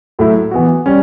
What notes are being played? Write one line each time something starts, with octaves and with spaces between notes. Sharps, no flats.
A2 F#3 A3 E4
E3 B3 F#4
G3 C#4